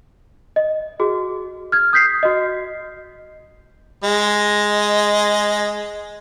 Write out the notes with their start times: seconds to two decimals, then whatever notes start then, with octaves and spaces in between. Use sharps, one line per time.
0.56 D#5
1.00 F#4 G#4
1.72 F6 G#6
1.93 D#6 G6 B6 C7
2.23 F#4 D#5
4.04 G#3 D#5